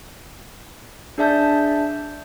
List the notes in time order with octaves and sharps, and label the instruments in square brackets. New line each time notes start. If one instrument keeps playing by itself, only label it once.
[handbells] D4 G#4 D5 E5 A5 G6